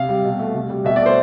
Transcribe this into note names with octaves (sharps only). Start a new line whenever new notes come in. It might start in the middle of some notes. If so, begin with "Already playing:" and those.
Already playing: C3 F5
G3
B2
A3
C3
G3
B2 E5
A3 D5
C5